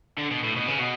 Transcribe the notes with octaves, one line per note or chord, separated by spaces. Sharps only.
D3
B2
A2
B2
C#3
B2